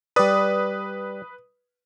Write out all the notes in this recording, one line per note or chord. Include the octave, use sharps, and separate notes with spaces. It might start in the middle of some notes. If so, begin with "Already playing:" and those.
G3 B4 D5 D#6